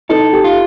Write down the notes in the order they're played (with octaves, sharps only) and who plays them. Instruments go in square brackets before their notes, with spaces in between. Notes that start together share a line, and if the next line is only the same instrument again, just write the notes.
[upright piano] D#4 [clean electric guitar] A4
[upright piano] G4
[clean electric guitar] F4